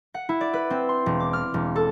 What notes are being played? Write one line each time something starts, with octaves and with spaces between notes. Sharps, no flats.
F#5
E4
D5
B4
C4
C6
E1
D6
F6
E1
A4